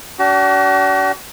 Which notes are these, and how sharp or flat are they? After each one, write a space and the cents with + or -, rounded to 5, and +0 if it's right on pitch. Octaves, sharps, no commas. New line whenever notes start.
D4 -35 F#4 +45